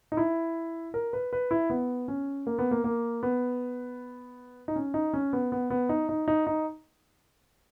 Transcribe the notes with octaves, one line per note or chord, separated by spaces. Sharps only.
D#4
E4
A#4
B4
B4
E4
B3
C#4
A#3
B3
A#3
A#3
B3
D#4
C#4
D#4
C#4
B3
B3
B3
D#4
D#4
D#4
D#4